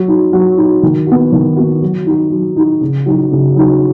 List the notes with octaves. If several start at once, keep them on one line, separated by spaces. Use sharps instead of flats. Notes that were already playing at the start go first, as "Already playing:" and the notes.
Already playing: F#3
D#4 F#4
F#3
D#4 F#4
D#3
B3 F#4
D#3
B3 F#4
F#3
D#4 F#4
F#3
D#4 F#4
C#3
F#3 D#4 F#4
C#3
F#3 D#4 F#4